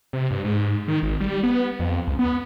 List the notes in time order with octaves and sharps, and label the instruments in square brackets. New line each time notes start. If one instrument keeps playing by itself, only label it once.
[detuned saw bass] C3
G2
G#2
D#3
G#1
G3
B3
F2
C#2
B3